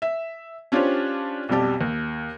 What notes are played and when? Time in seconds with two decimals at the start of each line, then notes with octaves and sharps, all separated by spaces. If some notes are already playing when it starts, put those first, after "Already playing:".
0.02 E5
0.72 C#4 D4 F4 G4 C5 C#5
1.49 B1 F2 G3 G4 A5
1.81 D#2